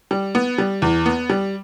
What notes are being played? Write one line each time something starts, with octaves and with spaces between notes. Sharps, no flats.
G3
B3
G3
E2
B3
G3